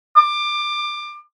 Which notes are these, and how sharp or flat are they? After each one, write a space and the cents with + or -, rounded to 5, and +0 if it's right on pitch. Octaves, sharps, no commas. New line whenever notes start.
D6 +20